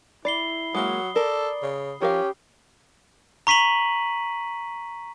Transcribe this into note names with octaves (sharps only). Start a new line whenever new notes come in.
E4 D5 B5 C7 G7
F#3 G#3 A#3 D#6 G7
A4 A#4 D5
C#3
F3 C#4 G4 A#4 F5
A#5 C#6 B6 D#7 F#7